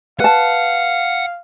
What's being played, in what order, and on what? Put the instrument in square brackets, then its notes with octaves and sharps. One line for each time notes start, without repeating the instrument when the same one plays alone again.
[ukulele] B4 A5 [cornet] F5 [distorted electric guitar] F#5